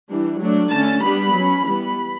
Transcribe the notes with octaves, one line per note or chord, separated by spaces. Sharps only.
E3 G3 D4
F#3 A3 D4
D3 A3 C#4 A5
G3 B3 D4 B5
F#3 C#4
E3 G3 B3 B5